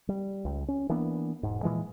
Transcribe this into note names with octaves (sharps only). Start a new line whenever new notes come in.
G3
C#2
C#4
E3 A#3 B3 D4
E1 G#2
A#2 E3 F3 G#3